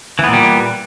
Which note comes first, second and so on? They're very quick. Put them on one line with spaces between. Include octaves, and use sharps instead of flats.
E3 B3 A#2 G3